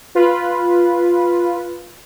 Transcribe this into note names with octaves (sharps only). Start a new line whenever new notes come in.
F4 B4